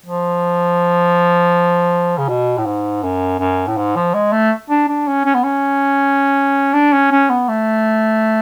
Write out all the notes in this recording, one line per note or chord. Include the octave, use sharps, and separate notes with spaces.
F3
C#3
B2
A2
G#2
F#2
F#2
A2
G#2
F3
G#3
A3
D4
D4
C#4
C#4
B3
C#4
D4
C#4
C#4
B3
A3